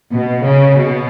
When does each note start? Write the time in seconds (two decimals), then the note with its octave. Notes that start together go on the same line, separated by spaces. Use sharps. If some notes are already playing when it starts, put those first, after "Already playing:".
0.13 B2
0.44 C#3
0.77 B2